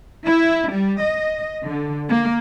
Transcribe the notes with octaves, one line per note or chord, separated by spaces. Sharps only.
E4
G3
D#5
D3
A#3